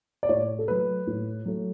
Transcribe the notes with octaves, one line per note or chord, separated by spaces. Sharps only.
D5
A2 C#5
A4
F#3 A3 B4
A2
F#3 A3